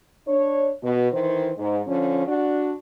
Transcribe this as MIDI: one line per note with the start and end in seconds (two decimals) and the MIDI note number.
0.27 0.70 62
0.27 0.70 73
0.83 1.08 47
1.12 1.50 51
1.12 1.50 52
1.12 1.50 72
1.58 1.80 44
1.87 2.23 50
1.87 2.23 53
1.87 2.23 61
2.28 2.74 62
2.28 2.74 66